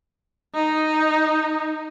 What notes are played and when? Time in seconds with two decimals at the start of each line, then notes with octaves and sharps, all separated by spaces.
0.55 D#4